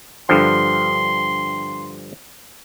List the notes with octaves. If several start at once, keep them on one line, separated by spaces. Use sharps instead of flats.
G2 D3 F3 C6